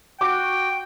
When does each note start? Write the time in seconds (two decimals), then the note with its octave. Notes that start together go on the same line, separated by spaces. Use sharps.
0.21 F#4 G5 D6